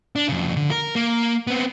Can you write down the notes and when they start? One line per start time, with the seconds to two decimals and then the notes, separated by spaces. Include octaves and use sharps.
0.16 D4
0.29 F2 C#3
0.57 D3
0.71 A#4
0.95 A#3
1.47 B3 C4